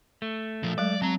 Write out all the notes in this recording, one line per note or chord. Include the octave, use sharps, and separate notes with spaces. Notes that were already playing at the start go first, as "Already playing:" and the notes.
A3
A#2 F3
F#3 G#3 D5
F#3 C4 A#5